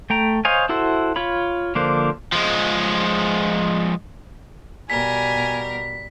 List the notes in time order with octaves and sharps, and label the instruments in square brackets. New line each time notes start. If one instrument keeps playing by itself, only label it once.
[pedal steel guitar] A3 G5 A#5
C5 C#5 D#5 F5 G#5
E4 F#4 A4 C5 E5
F4 C#5 B5
D3 F3 A#3 D4 C5
[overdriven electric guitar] F3 G#3
[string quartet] B2 G3 A#4 [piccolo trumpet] G#5 [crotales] B6